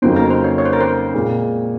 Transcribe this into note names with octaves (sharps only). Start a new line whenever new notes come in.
F2 C#3 F#3 A#3 D#4 C5
A#4
C5
C#5
C#5
C5
A#4
C5
A#2 G#3 C4